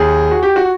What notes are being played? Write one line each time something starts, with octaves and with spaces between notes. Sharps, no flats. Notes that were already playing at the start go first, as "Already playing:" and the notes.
Already playing: D#2 G#4
F#4
G4
F#4